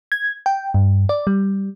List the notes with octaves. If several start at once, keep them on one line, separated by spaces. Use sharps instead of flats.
G#6
G5
G2
D5
G3